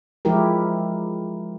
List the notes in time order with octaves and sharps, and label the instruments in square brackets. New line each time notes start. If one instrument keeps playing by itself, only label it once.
[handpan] F3 G#3 E4 G4 A#4